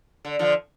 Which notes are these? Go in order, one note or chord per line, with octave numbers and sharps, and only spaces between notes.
D3
D3 F3